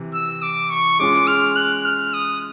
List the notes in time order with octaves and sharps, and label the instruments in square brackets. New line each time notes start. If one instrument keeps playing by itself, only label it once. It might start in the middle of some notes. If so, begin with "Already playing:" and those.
Already playing: [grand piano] C3 E3
[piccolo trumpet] E6
D6
C#6
[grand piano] G#3 C#4 F4 G#4 [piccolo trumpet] D6
[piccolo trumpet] F6
F#6
F6
D#6